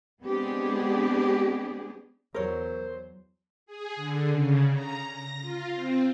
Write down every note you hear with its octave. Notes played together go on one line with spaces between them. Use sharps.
G#3 B3 C4 D4 G4 G#4
E2 F#3 A#4 C5 C#5
G#4
D3
C#3
A#5
A#6
F4
C4